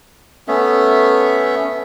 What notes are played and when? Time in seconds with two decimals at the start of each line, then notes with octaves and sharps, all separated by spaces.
0.48 A3 B3 C#4 E5